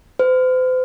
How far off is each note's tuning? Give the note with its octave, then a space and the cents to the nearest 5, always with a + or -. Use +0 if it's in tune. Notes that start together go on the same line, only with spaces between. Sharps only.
C5 -40